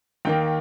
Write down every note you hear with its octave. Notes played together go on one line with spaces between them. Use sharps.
D#2 D#3 A#3 G5